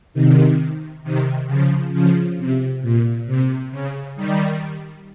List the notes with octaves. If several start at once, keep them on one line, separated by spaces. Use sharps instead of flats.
C3 D#3
C3 D#3
C#3 F3
C#3 F3
C3
A#2
C3
C#3
D#3 G3